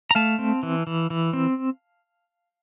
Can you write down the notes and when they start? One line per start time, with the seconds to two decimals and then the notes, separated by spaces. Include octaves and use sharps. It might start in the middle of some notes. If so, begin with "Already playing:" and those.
0.11 A#5
0.15 A3 F5 A5
0.39 C4
0.63 E3
0.87 E3
1.10 E3
1.33 C4